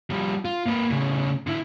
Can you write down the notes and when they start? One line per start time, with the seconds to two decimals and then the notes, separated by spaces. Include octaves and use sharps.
0.10 F3 G3
0.45 F4
0.66 A#3 B4
0.90 A2 C#3
1.47 D3 E4